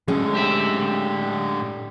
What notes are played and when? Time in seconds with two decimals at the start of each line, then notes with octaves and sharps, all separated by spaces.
0.08 A2 D3 G#3 C#4
0.35 G4 E5